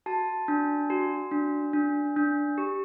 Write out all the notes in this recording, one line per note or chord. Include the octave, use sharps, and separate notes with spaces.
F#4 A5
D4
F#4
D4
D4
D4
G4